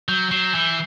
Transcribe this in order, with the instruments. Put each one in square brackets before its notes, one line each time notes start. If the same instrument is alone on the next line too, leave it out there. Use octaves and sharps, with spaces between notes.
[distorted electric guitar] F#3 [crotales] G6
[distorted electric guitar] F#3 [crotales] C7 E7
[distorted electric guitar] E3 [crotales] G6